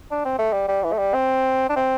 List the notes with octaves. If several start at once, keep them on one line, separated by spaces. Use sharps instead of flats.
D4
C4
A3
G3
G3
E3
A3
G3
C4
D4
C4